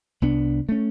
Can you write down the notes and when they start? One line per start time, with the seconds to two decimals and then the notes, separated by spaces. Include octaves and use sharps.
0.22 C2 B3 D4
0.69 A3 C#4